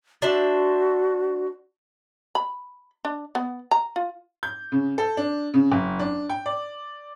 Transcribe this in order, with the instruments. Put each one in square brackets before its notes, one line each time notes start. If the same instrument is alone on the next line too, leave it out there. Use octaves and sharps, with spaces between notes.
[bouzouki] D4 C5 E5 [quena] F#4
[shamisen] B5
D4
B3
A#5
F4
[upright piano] G6
C#3
A4
D4
C#3
F#1
D4
G5
D5